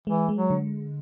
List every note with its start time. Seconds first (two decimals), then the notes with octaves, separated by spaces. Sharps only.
0.07 E3 G#3
0.29 G#3
0.35 F#3
0.50 D3